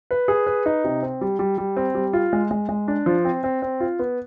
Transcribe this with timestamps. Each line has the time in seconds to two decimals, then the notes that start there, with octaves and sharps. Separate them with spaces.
0.11 B4
0.28 G#4
0.47 B4
0.66 D#4
0.84 C3
1.03 C4
1.21 G3
1.39 G3
1.58 G3
1.77 C4
1.95 G3
2.13 F4
2.33 G#3
2.51 G#3
2.69 G#3
2.88 D4
3.06 F3
3.25 C4
3.44 C4
3.62 C4
3.80 F4
3.99 B3